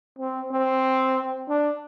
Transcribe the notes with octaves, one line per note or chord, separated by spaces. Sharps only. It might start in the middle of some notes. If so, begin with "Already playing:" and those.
C4
C4
D4